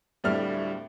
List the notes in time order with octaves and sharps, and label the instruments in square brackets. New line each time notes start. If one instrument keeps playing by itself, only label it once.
[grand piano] D1 A2 G3 A3 D4 F6